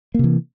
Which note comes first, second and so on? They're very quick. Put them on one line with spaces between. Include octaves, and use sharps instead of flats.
A#3 C3 E3